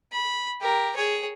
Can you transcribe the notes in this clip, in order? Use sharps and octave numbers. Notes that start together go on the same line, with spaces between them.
B5
G4 A#4
G#4 C#5